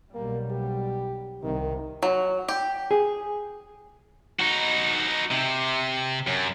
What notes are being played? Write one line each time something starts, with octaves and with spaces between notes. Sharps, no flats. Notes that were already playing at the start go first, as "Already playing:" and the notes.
B1 G3 A#3
G4
C2 C3 D#3
F#3
G4
G#4
D#4 F#4
C3
F#2